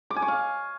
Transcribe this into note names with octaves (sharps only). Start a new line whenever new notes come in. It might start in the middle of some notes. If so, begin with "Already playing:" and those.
D6
G#5
C#6
F5